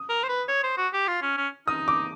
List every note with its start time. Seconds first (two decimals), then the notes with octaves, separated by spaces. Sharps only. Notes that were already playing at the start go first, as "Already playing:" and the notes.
Already playing: D#6
0.10 A#4
0.24 C5
0.29 B4
0.48 C#5
0.64 C5
0.78 F#4
0.94 G4
1.08 F4
1.22 C#4
1.38 C#4
1.67 D#4 D#6
1.88 D6